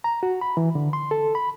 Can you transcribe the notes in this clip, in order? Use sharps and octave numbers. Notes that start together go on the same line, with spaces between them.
A#5
F#4
B5
E3
D3
C6
A4
B5